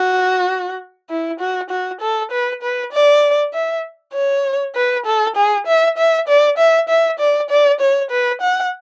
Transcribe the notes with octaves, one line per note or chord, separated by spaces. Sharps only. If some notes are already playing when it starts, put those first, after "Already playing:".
Already playing: F#4
E4
F#4
F#4
A4
B4
B4
D5
E5
C#5
B4
A4
G#4
E5
E5
D5
E5
E5
D5
D5
C#5
B4
F#5